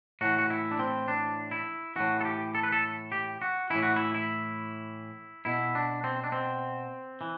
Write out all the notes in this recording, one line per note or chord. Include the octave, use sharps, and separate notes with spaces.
A2 E3 F#4
F#4
E4
D4
C4
D4
E4
A2 E3 F#4
A4
G4
A4
B4
A4
G4
F#4
A2 E3 E4
F#4
E4
E4
B2 E4
D4
C4
D4
C4
E3